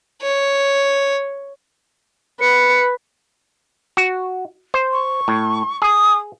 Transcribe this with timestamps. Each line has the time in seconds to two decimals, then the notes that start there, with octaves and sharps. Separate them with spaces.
0.22 C#5
2.40 B4 C#7
3.97 F#4
4.74 C5
4.92 C#6
5.28 A2
5.82 G#4 D#6